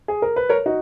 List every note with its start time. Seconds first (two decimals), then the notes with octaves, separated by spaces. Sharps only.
0.08 G#4
0.22 A#4
0.36 B4
0.49 A#4 C#5
0.66 D#4 F#4